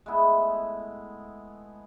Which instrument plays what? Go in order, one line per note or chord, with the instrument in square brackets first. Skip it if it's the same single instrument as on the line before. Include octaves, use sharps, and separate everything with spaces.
[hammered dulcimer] G#3 A3 B3 E4